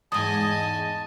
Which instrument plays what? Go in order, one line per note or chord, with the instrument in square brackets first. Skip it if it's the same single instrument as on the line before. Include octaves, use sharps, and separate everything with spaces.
[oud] E2 G#2 [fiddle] D#5 G#5 [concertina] A5 [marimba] D#6